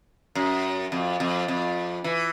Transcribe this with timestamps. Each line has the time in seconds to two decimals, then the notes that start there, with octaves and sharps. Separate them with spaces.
0.35 F#2
0.92 F2
1.20 F2
1.48 F2
2.04 E3